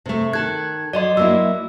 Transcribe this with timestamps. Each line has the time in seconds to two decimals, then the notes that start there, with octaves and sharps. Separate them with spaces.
0.06 C3 A3
0.33 D#3 A4 F#6 G#6
0.93 F#3 D5 D#5 C6
1.17 F#3 A#3 E4 E6